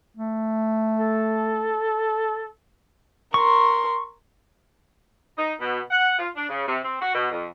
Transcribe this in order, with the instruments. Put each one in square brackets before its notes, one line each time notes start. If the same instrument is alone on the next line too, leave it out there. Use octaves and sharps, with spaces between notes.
[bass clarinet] A3
[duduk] A4
[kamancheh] A#4 C6 [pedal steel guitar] C#6
[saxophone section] D#4
B2
F#5
F4
D4
C#3
C3
C4
F#4
B2
F2